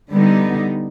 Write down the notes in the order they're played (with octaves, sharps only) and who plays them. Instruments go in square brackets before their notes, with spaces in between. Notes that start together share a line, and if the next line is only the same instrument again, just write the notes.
[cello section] D3 G3 B3 D#4